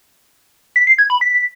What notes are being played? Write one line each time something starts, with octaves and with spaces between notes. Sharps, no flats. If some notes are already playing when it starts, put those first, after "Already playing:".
B6
C7
G#6
B5
B6